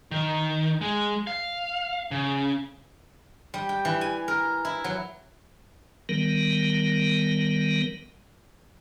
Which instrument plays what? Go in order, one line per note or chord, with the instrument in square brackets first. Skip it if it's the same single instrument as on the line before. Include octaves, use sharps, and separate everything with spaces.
[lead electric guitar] D#3
G#3
F5
C#3
[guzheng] G3
G5
E3
G#5
A#4
E4
F#3
[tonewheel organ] D#3 G3 B3 A#4